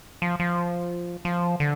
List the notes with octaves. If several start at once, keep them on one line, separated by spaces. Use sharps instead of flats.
F3
F3
F3
D3